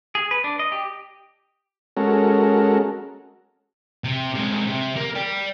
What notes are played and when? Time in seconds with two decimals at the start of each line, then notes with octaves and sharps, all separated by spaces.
0.15 G#4
0.31 B4
0.44 D4
0.59 D#5
0.72 G4
1.97 G#3 C#4 F#4 A4 A#4
4.04 C3
4.35 C3 G#3
4.67 C3
4.96 A#3
5.15 D5 G5